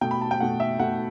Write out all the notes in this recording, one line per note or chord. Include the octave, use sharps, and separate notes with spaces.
B2 A3 G5
B5
A5
G5
B2 A3 F#5
E5
B2 A3 F#5